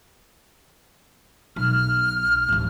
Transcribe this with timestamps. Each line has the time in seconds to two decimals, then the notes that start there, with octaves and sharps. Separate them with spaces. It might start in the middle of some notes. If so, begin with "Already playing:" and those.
1.56 B1 F6
2.48 D1 A1